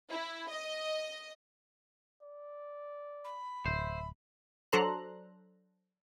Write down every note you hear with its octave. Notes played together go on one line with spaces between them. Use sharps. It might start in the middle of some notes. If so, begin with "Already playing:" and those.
E4
D#5
D5
B5
D1 C5 E5
F#3 D4 A4 C5 A#5 F#6